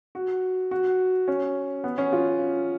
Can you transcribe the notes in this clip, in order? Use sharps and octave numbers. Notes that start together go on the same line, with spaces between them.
F#4
F#4
C#4
B3
C#4
F4